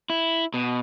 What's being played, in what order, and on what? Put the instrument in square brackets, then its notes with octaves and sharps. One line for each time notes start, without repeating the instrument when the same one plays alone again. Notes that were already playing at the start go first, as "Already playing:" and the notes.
[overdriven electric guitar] E4
B2